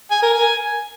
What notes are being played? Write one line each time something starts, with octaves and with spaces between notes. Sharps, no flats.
G#5
A#4
G#5